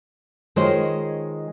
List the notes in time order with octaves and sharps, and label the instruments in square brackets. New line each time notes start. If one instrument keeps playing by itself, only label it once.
[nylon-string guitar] D#3 G#3 F4 C5 C#5 D#5